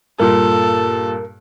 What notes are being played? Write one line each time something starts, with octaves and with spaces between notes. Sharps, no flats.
G2 A#2 A4 A#4